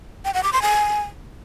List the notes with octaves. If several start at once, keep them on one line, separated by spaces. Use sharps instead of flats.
G5
F#5
D6
C6
G#5